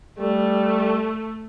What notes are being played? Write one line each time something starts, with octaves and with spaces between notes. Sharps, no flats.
G3 A3